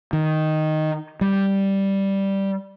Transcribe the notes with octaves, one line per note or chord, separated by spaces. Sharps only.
D#3
G3